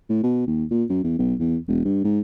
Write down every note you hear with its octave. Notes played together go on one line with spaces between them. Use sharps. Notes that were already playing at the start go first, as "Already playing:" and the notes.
A2
B2
D#2
A#2
F#2
E2
B1
E2
E1
G2
G#2